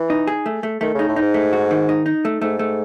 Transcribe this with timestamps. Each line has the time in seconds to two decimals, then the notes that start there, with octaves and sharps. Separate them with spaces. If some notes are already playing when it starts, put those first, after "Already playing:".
Already playing: E3
0.10 D#4
0.27 G#4
0.46 A3
0.63 A3
0.81 D#3 A3
0.94 C#3
0.99 D#4
1.08 A2
1.16 D#4
1.21 G#2
1.34 A3
1.53 F#4
1.71 D#3
1.89 D#4
2.06 D#4
2.25 A3
2.41 G#2 A3
2.59 A3